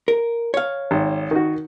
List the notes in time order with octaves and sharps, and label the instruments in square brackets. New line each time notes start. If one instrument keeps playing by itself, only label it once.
[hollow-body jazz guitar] A#4
C#5 F5
[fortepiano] G#1
D#3 F#4